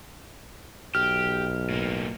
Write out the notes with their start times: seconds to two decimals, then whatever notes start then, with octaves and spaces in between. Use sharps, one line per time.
0.95 B1 G4 F6
1.70 A2 A#3